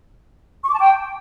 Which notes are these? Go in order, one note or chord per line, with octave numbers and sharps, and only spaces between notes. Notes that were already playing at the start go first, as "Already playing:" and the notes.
C#6
D6
A5
G5